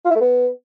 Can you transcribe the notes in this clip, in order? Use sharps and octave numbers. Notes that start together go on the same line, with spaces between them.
F4
E4
A3
B3